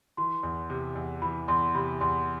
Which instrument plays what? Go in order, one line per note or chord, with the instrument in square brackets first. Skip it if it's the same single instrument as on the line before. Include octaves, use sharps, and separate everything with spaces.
[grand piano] E3 [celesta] C6
[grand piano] E2
C3
E2
[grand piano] E3 [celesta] B5
[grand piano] E2 [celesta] C6
[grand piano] C3 [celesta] B5
[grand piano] E2 [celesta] C6